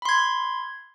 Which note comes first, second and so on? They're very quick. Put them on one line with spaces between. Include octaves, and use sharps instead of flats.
B5 C6 G#6